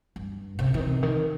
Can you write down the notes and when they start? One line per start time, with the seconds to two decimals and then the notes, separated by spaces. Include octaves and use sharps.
0.16 G2
0.59 C3
0.74 D#3
0.80 C3
1.03 D#3